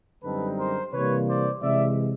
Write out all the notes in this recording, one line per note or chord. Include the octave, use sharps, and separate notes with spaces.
F#2 D3 G3 C4 D#4 A4 B4
A#4 C5
C3 E3 G3 A#3 B4 C#5
C5 D5
C3 E3 G#3 D5 E5